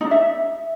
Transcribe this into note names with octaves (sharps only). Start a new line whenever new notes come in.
D#4
D4
E5